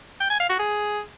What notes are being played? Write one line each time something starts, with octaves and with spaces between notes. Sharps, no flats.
G5
G#5
F5
F#4
G#4